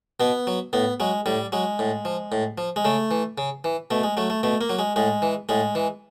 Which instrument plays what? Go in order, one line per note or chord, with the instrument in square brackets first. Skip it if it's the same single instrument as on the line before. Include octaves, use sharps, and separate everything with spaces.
[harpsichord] B2 B3
F#3
A2 B3
F#3 G#3
A2 G3
F#3 G#3
A2
F3
A2
F3
G#3
C#3 A3
E3
C#3
E3
B2 A3
G#3
F#3 A3
A3
B2 A3
A#3
F#3
G#3
A2 G#3
E3
A2 G#3
E3